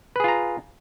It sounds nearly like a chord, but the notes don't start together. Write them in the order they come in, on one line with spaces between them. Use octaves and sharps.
B4 G#4 F4 A#5